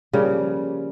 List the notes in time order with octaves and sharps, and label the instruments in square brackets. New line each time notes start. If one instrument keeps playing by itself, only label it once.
[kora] C#3 F3 G3 A#3